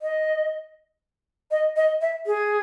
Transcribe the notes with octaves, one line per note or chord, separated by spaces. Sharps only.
D#5
D#5
D#5
E5
G#4